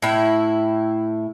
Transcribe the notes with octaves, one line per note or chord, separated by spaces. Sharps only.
A2 E4